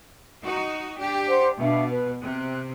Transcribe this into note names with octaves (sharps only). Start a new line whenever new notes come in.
D#4 F#4
D4 G4
C5 F#5
B2 D4 E5 F5
B4
C3 F#6